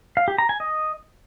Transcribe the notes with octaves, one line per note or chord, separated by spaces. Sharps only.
F5
G4
A#5
G#5
D#5